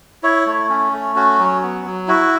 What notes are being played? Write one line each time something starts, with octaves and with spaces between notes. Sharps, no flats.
E4 C#5
A3
C#4
A3
C#4 F#4
F#3
B3
F#3
E4 F#4